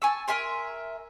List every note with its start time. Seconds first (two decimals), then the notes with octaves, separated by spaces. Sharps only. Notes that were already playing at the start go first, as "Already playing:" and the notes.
0.02 G#5 A5 C#6 E6
0.28 A#4 E5 G#5 C6